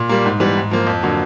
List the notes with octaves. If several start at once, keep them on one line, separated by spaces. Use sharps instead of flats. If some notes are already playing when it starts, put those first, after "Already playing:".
Already playing: A#2
G3 A#3
G#2
E3 G3 B3
G#2
F3 A#3
F2
D3 F#3 A#3